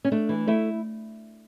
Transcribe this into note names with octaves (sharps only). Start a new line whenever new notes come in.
C#4
A3 D4
E3
A3 E4